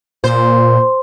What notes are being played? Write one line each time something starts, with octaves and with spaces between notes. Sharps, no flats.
A#2 C5